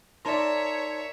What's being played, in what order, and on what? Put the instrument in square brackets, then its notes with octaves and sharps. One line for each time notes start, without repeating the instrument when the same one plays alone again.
[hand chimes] D#4 A5 C6 [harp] A#4 D5 [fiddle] C#5 E5